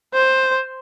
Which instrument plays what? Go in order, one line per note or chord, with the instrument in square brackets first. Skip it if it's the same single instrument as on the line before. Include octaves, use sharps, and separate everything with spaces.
[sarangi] C5